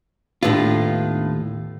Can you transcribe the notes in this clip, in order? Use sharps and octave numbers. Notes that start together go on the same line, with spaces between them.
D#2 A2 B3 D4 F4